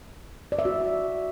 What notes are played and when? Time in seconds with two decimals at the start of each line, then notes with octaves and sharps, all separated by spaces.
0.52 D5
0.59 E5
0.65 F#4